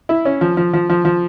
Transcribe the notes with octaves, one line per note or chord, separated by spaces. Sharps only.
E4
C#4
F3
F3
F3
F3
F3